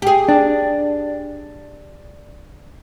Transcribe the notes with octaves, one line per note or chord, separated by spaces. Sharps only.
G4 G#4
D4